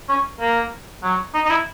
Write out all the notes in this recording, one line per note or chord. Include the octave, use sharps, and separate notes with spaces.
C#4
A#3
F#3
D#4
D#4
E4